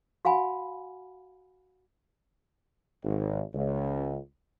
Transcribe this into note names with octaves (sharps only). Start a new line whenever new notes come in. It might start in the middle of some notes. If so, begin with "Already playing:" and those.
F#4 F5 F#5 G#5 B5
G#1
C#2